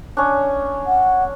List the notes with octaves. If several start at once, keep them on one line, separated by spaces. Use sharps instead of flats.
C#4 D4
F#5